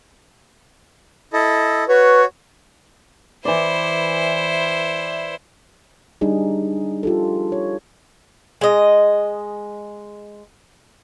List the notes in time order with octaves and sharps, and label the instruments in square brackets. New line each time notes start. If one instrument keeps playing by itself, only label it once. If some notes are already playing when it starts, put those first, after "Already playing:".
[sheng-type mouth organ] E4 A4 D#5
[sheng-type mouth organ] F#4 C#5 [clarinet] B4
[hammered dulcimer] E3 D5 [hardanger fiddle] E4 C5
[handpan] G3 D4 D#4 G#4
F4 G4 A4
C#5
[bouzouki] G#3 D#5